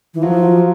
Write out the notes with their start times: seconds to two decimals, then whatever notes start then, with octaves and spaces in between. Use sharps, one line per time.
0.14 E3
0.22 F3 F#3